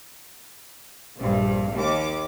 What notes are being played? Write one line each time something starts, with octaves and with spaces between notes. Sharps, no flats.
A#1 G2
D#2 D6